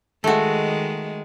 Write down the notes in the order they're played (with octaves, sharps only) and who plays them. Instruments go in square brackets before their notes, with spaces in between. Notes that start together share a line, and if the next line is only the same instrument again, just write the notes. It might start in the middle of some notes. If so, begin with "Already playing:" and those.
[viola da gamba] D#3 G#3 [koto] A3 F#4